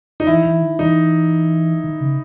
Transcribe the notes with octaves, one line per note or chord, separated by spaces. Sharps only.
D#4
E3 E4
E3
D#3
E3 D#4
D#3
C#3